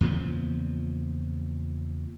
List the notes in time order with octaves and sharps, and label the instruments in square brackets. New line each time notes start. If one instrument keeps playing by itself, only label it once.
[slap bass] E2 A#2 C#3 F3